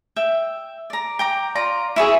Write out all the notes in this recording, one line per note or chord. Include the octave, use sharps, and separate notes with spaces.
E5 G5
D5 A#5
G5 A#5 D6
F4 D5 A#5
E4 F#4 G#4 E5